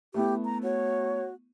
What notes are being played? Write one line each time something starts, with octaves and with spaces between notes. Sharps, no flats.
A3 B3 E4 G4
A#5
F#4 C#5